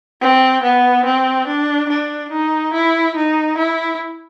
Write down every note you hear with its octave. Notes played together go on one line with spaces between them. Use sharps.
C4
B3
C4
D4
D4
D#4
E4
D#4
E4